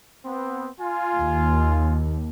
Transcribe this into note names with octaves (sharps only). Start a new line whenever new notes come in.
B3 C4
F4 G#5
D#2